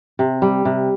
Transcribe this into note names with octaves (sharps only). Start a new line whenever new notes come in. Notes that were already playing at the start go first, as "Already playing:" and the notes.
C3
G3
C3